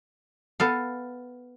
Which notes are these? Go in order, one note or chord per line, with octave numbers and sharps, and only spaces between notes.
B3 A4 F5